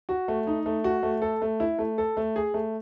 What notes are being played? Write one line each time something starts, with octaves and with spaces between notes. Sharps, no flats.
F#4
A3
D#4
A3
F#4
A3
A4
A3
E4
A3
A4
A3
G#4
A3